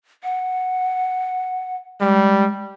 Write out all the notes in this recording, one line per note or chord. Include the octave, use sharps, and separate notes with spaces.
F#5
G3 G#3